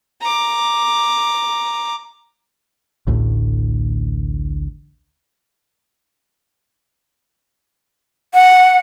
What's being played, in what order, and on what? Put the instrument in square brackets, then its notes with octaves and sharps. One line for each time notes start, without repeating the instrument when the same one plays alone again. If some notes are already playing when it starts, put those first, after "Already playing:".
[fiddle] A#5 D6
[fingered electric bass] A1 D2 A2 D3
[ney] F#5